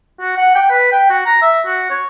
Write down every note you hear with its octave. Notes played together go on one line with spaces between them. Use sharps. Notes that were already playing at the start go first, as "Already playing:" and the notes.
F#4
F#5
G5
B4
G5
F#4
A#5
E5
F#4
C#5